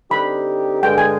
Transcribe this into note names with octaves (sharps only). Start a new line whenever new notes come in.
D3 G3 C4 D#4 G4 B5
G2 D3 G#3 G5
G#5